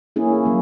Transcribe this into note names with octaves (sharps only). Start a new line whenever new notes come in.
A#3 C#4 E4 G#4
F#3 A#3